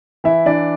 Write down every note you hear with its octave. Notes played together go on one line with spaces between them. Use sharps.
E3 E4 E5
E3 D4 D5